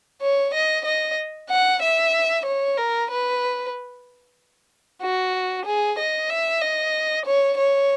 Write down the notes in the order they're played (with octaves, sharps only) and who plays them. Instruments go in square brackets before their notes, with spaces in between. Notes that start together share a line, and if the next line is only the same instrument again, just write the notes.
[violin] C#5
D#5
D#5
F#5
E5
C#5
A#4
B4
F#4
G#4
D#5
E5
D#5
C#5
C#5